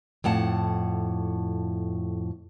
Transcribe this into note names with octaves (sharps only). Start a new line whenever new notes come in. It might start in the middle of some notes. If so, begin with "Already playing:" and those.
F2 A2 F#5 A5